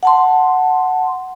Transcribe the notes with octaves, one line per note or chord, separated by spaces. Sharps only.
F#5 A5 C6